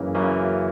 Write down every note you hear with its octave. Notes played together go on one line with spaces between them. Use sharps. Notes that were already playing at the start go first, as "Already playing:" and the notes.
Already playing: F#2 C#3 E3 A#3 C#4
F#2 C#3 E3 A#3 C#4